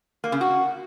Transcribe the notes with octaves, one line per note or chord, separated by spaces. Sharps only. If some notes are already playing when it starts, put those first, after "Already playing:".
A#3
C#3
F#4